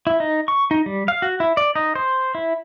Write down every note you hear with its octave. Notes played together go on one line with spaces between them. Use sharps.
E4
D#4
C#6
D#4
G3
F5
F#4
E4
D5
D#4
C5
E4